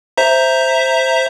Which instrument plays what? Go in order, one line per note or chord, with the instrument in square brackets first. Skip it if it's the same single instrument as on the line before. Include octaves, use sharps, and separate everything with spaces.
[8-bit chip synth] C5 E5 A#5